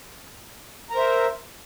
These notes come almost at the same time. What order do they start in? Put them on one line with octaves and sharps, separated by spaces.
A#5 A#4 C5 E5